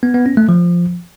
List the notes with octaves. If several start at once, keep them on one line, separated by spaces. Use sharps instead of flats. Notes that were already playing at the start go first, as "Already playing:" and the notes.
B3
B3
C#4
A3
F3